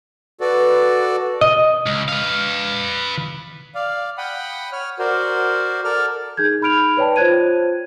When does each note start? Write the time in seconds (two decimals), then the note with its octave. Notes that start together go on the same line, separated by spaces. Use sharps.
0.41 F#4 A4 B4 D5
1.41 D#5
1.86 C#2
2.08 B4 F5
3.75 D5 F5
4.18 F#5 G5 B5 D#6
4.72 C#5 F6
4.99 F#4 A#4 C5 D5
5.84 A4 A#4 D5 F6
6.37 D#4 G#4 G6 G#6
6.61 D#4 B5 F6 D7 F7
6.97 B4 C#5 D5 G5 A5
7.16 F4 C5 C#5 F#6 G#6 D#7